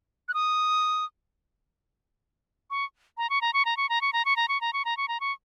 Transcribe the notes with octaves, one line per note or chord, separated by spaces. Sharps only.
F#6
D#6
C#6
A#5
C#6
A#5
C#6
A#5
C#6
A#5
C#6
A#5
C#6
A#5
C#6
A#5
C#6
A#5
C#6
A#5
C#6